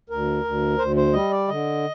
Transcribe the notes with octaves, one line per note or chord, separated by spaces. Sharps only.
D2 A#4
D2
D2 C5
C5
G3 D#5
D5
D3 D#5